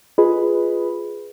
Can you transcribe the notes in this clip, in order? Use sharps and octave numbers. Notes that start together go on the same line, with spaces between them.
F4 G#4 B4 D#5 B5